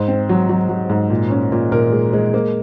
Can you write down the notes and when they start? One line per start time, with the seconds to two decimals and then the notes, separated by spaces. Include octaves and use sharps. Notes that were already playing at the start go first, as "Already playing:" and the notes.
Already playing: G#2 C5
0.08 C4
0.29 F#3
0.49 F#3
0.69 F#3
0.90 G#2
1.10 A#2
1.30 C#4
1.52 A#2
1.72 A#2 A#4
1.92 G#3
2.13 G#3
2.34 A#3